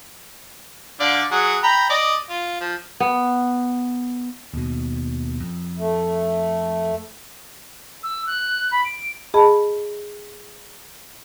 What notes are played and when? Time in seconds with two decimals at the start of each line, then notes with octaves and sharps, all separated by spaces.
1.00 D3 D5 F5
1.31 F#3 G#4 F#5
1.63 G5 A#5 B5
1.90 D5 D#5
2.29 F4
2.61 F3
3.00 B3
4.54 D#2 B2
5.40 F2
5.79 A3
8.03 E6
8.26 F#6
8.71 B5
8.84 D7
9.34 G#4 D#5 A5 B5